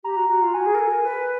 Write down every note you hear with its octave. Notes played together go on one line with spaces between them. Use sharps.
G4 A#5
F#4
F#4 A#5
F4
F#4 G#5
G#4
A#4
A4
A#4
B4